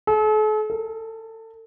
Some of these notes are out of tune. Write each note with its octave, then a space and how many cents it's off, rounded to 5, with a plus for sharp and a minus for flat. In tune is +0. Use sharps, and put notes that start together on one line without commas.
A4 -45
A4 +30